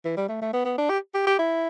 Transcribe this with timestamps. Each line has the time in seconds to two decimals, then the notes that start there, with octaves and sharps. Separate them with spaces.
0.05 E3
0.17 G3
0.29 A3
0.42 A3
0.53 B3
0.65 B3
0.78 D4
0.90 G4
1.14 G4
1.27 G4
1.39 E4